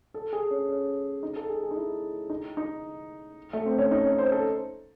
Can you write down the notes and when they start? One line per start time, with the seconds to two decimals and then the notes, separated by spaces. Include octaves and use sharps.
0.14 A4
0.33 G#4
0.51 C#4
0.69 C#4
1.23 D#4
1.36 A4
1.49 G#4
1.63 G#4
1.71 D#4
1.77 E4
2.30 D#4
2.57 D#4
3.53 A3
3.66 C4
3.78 C#4
3.91 D#4
4.05 C#4
4.19 C5
4.32 A4